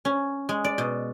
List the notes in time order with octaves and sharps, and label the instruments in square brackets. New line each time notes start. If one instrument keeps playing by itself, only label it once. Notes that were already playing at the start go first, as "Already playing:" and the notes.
[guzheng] C#4
G#3
D5
B2